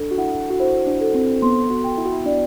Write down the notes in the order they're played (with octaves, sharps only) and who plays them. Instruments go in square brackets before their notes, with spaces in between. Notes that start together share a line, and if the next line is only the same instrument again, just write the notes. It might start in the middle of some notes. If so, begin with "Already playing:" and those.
Already playing: [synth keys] D4 [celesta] A4
[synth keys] F#4
[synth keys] E4 [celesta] F#5
[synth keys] F#4
[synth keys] E4 [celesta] C5
[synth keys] D4
[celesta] A4
[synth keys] C4
[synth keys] B3 [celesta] C6
[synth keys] F#4
[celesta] G5
[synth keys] E4
F#4
E4
[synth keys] D4 [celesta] D5